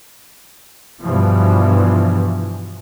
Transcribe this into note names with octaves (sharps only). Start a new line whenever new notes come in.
G2 B2 E3 F3